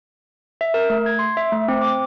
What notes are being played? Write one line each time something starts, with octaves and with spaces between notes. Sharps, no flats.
E5
A#4
A3
G#6
C6
E5
A3
C4
D6